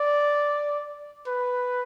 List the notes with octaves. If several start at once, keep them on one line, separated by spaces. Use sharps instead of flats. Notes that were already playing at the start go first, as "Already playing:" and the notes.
Already playing: D5
B4